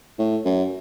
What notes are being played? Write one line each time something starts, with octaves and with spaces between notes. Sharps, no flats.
A2
F#2